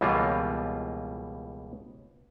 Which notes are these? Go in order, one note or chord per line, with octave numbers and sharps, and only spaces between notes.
C#2 B2 E3 G3 A#3 F4